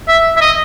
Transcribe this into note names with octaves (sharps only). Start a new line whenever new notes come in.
E5
E5
D#5